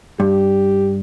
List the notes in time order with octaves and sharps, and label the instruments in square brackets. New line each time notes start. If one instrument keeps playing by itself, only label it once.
[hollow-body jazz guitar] G2 [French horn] G4